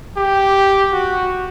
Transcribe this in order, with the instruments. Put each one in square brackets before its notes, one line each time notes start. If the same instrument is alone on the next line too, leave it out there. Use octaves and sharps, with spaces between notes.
[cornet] G4
F#4